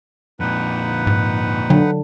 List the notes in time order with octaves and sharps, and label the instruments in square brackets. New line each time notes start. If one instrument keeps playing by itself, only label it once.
[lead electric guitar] F2 A#2 [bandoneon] D#4 B4 F#5
[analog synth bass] G#2
[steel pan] D3 [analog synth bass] F#3